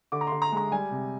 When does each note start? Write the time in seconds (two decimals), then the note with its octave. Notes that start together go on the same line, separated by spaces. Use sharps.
0.12 D3 D6
0.21 A#5
0.27 D3 C6
0.42 A#5
0.52 G#3 A#5
0.72 G3 G#5
0.91 C3